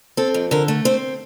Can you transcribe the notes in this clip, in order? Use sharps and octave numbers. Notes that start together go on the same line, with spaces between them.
C4 A4
F2
D3 A#4
A3
C4 C5